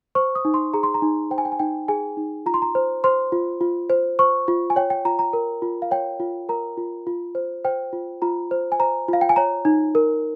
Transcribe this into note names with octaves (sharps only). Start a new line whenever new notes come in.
C5 C#6
D#6
D#4
C6
G#4 A#5
C6
A#5
D#4
C5 G5
G#5
G5
G#5
D#4 G5
G#4 G#5
D#4
F4 A#5
C6
A#5
C5
C5 C6
F4
F4
C5
C5 C#6
F4
G#5
C#5 G5
G5
F4 A#5
A#5
A#4
F4
F5
C#5 G5
F4
A#4 A#5
F4
F4
C5
C5 G5
F4
F4 A#5
C5
G#5
C5 A#5
F4 F5
G5
G#5
C#5 A#5
D#4
A#4